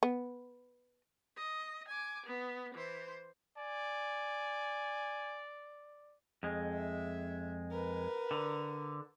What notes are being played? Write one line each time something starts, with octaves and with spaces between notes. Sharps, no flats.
B3
D#5
G#5 D6
B3
E3 C5
D5 G#5
F2 G#3
E5
A#4 B4
D3